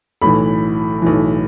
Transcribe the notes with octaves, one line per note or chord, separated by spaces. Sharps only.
B1 A2 E3 B5
B1 A2 E3